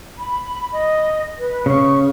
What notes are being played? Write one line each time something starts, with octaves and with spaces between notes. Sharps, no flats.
B5
D#5
B4
C#3 C#6